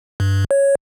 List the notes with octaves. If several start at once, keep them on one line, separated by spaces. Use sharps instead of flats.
G2
C#5